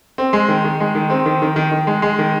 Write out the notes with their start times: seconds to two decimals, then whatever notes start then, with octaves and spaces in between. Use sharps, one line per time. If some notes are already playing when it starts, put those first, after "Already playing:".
0.18 C4
0.33 G#3
0.48 D#3
0.64 D#3
0.80 G#3
0.95 D#3
1.10 C4
1.26 D#3
1.42 D#3
1.56 D#3
1.72 D#3
1.87 G#3
2.02 G#3
2.19 D#3